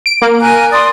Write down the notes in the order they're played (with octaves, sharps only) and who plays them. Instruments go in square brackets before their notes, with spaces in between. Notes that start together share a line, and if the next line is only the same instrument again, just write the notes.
[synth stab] D7
A#3
[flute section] A#4 G#5 F#6
D5 C6 D#6